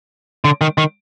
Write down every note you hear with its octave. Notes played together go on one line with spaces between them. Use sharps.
D3
D#3
D#3